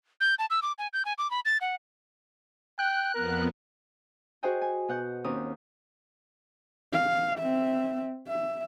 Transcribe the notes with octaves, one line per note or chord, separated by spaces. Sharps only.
G6
A5
E6
D6
G#5
G6
G#5
D6
B5
A6
F#5
G5 F#6
F2 B3 A#4
F#4 G#4 C5 D#5 G5 G#5
G#5
B2 F#5 G6
D#2 C4 C#4 D#6
F5
C4 E5
E5